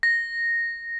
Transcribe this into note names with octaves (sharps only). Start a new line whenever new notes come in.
A#6